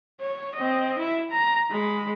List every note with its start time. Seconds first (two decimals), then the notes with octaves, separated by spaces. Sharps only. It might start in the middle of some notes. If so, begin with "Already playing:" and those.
0.21 C#5
0.55 C4 D#5
0.98 E4 E5
1.31 A#5
1.71 G#3 B5